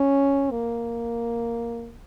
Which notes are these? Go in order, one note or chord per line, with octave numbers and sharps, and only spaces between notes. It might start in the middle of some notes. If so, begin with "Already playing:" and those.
Already playing: C#4
A#3